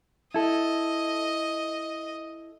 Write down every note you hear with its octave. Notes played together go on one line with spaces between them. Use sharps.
E4 A4 D#5